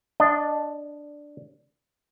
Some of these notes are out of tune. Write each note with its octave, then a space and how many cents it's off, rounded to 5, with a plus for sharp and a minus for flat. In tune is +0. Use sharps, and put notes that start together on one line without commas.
D4 +0 D#5 -20